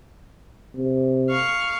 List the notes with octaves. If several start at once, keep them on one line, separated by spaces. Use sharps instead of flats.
C3
F5 C#6